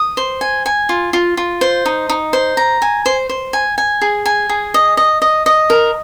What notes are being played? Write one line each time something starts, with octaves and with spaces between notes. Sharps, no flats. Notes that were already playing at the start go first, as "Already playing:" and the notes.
Already playing: D#6
C5
G#5
G#5
F4
F4
F4
C5
D#4
D#4
C5
A#5
G#5
C5
C5
G#5
G#5
G#4
G#5
G#4
D#5
D#5
D#5
D#5
A#4